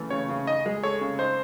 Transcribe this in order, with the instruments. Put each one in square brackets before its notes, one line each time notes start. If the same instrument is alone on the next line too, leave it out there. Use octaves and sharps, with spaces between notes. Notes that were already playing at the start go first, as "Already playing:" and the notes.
Already playing: [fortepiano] C#3 E3 A3
[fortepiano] C#3 [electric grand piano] C#5
[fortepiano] C#3
[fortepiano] D#4 [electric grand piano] D#5
[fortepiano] G#3
[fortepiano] A4 [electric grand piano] C#5
[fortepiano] C#3
[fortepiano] D#4 [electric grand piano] C5